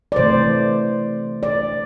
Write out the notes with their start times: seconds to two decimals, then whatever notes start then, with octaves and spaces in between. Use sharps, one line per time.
0.12 D5
0.16 C3 E3 A3 C5
1.43 D5